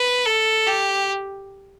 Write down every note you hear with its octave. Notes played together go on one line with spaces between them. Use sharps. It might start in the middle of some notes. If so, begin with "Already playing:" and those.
Already playing: B4
A4
G4